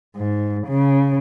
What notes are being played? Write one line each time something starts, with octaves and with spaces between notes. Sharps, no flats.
G#2
C#3